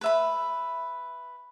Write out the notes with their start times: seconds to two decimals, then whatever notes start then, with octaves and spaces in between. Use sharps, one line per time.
0.01 B4 E5 B5